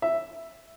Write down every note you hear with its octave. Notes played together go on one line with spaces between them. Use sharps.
E5